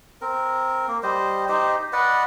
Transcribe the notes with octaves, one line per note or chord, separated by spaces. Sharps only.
C4 A#4
A#3
G3 C5 D#5
D#4 G4 C5 D#5
B4 D5 D#5 F#5